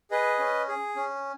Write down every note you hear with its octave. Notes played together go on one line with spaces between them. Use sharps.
G#4 B4 D#5
C#4
G#4
C#4